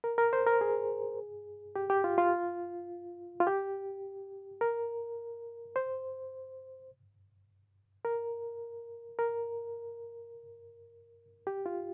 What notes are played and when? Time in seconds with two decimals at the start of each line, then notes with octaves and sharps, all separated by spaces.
0.04 A#4
0.18 A#4
0.33 C5
0.47 A#4
0.61 G#4
1.76 G4
1.90 G4
2.04 F4
2.18 F4
3.40 F4
3.47 G4
4.61 A#4
5.76 C5
8.05 A#4
9.19 A#4
11.47 G4
11.66 F4